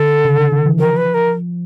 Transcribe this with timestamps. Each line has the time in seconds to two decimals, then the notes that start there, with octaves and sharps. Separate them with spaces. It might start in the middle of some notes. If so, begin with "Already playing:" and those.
Already playing: D3 A4
0.25 C#3
0.38 D3
0.52 D#3
0.66 E3
0.79 F3 A#4
0.97 B4
1.14 A#4